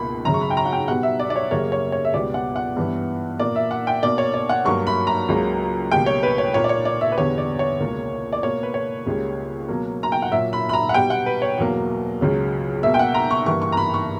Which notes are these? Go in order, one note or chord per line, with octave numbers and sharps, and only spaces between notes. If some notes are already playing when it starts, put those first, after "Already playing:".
Already playing: C#2 B2 A#3 B5
F#2 C#3 F#3 A#5
C#6
B5
G5
A#5
F#5
G5
B2 G3 B3 F#5
E5
D5
D5
C#5
F#2 C#3 G3 A#3 C#5
C#5
C#5
E5
C#2 B2 G3 B3 D5
F#5
F#5
G2 E3 B3
A#2 A#3 D5
E5
F#5
G5
B2 A#3 D5
C#5
D5
F#5
G2 F#3 A#3 C#6
B5
A#5
C#2 C#3 F#3 A#3
C#2 B2 G3 A#3 G5
C#5
B4
C#5
A#2 A#3 C#5
D5
C#5
D5
E5
B4
E2 D3 G3 B3 C#5
D5
C#5
C#2 B2 A#3
D5
B2 A#3 C#5
B4
C#5
C#2 C#3 G3 A#3
B2 F#3 A#3
A#5
G5
F#5
A#2 F#3 A#3 E5
B5
B5
A#5
F#5
B2 G3 B3 G5
F#5
B4
C#5
E2 B2 F#3 A#3
C#2 C#3 F#3
B2 A#3 E5
G5
F#5
A#5
C#6
G2 E3 A#3 C#6
C#6
A#5
B5
C#6